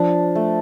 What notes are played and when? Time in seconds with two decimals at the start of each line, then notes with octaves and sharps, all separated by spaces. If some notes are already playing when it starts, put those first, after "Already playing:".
Already playing: F3 D4
0.35 A3